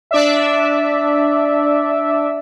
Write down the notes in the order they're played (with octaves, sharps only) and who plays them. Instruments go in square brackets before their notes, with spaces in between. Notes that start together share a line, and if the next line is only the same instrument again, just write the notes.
[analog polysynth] D4 D5 E5